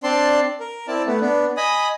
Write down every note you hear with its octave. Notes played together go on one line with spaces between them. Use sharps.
C4 D4 D5 A5 C6
A#4
C4 E4 D5 A5
A3 B3
B3 D4
D#5 G#5 B5 D#6